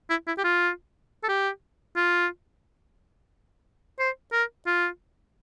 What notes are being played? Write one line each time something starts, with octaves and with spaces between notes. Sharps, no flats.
E4
E4
G4
F4
A4
G4
F4
C5
A#4
F4